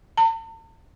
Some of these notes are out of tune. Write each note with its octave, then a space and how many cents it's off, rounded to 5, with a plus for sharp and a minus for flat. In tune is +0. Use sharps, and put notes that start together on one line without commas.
A5 +45